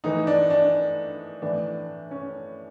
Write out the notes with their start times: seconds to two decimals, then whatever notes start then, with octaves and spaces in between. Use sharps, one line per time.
0.04 A2 E3 D#4
0.27 D4
0.50 D4
1.42 A2 E3 D4
2.11 C#4